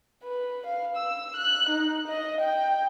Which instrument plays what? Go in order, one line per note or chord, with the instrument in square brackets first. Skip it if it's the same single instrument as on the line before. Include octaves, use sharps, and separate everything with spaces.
[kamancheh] B4
F5
E6
F#6
D#4
D#5
G5